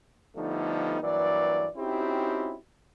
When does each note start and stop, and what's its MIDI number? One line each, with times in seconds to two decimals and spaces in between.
0.37 0.97 50
0.37 0.97 53
0.37 0.97 55
0.37 0.97 57
0.37 0.97 59
0.37 0.97 63
1.02 1.67 43
1.02 1.67 52
1.02 1.67 54
1.02 1.67 58
1.02 1.67 74
1.77 2.56 60
1.77 2.56 61
1.77 2.56 63
1.77 2.56 64
1.77 2.56 66
1.77 2.56 67